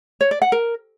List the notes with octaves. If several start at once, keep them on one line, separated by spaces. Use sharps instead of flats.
C#5
D5
F#5
A#4